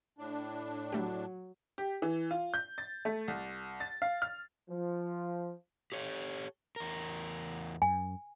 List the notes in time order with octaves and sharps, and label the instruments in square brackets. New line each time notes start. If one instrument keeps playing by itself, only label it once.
[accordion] A2 D4
[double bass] F#3 [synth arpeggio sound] A3 G4
[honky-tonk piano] G4
E3
F4
G6
A6
A3
C2
A6
F5
F6
[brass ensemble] F3
[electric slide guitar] G4 A4 C#5
E2 A#4
[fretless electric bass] F#2 [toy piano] G#5